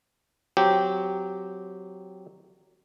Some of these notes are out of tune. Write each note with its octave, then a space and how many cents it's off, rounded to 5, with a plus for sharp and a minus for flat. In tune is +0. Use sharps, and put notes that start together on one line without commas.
F#3 +0 C4 -10 G4 -10